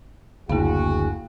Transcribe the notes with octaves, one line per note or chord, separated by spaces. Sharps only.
F#1 D2 A#3 F#4 G#4 F5